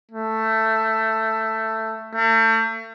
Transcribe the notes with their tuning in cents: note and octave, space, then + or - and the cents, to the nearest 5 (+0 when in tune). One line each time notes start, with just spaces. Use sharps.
A3 +10
A3 +40